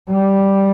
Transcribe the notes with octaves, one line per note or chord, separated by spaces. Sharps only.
G3